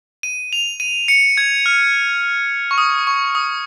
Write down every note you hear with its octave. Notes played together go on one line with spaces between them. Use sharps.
D#7
F7
D#7
C#7
G#6
F6
C#6
D#6
C#6
D#6